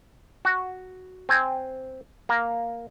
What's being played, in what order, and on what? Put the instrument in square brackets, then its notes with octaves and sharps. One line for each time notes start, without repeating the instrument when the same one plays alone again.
[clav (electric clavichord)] F#4
C4 G#5
A#3 A#5